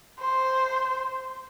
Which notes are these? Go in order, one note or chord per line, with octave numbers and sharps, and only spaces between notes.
C5